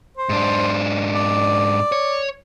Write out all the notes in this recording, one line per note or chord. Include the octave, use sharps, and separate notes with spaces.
C5
G#2 D4
D5
C#5